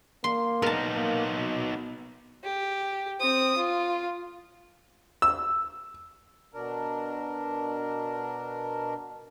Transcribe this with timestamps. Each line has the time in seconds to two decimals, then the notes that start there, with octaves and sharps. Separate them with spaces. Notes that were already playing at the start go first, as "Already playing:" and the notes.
0.24 A#3 C6
0.62 B3 D#4 A#4 A5
0.94 A#3
1.37 B2
2.44 G4
3.20 C4 D#6
3.57 F4
5.22 E6
6.53 B2 D4 A#4